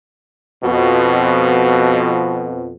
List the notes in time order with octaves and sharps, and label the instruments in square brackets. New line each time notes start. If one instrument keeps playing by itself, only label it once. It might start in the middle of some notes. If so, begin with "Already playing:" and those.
[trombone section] F2 B2